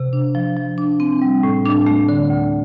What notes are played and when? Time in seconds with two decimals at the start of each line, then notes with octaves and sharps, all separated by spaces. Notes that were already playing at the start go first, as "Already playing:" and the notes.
Already playing: C3
0.13 D4
0.35 F3
0.56 F3
0.78 D4
1.00 C4
1.22 G3
1.43 A2
1.65 D4
1.87 A3
2.09 D3
2.30 D2